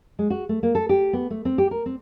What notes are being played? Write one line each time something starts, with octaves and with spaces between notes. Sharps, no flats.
G#3
F#4
A3
A#3
A4
G4
B3
A3
C4
G4
A#4
C4